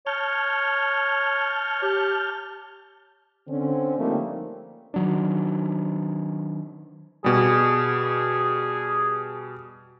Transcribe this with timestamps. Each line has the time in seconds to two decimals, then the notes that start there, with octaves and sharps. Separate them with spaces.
0.07 C#5 A5 F6 G6
1.83 G4
3.48 D3 C4 C#4
3.98 F3 G3 A3 A#3 C4 D#4
4.94 D#3 F#3 D4
7.24 B2 G3 G#4